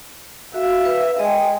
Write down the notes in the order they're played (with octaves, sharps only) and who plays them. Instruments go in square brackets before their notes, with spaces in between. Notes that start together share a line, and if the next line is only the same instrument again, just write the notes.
[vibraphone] F#4 [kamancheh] E5 F5
[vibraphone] B4
[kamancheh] G#3 [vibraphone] D#5 G5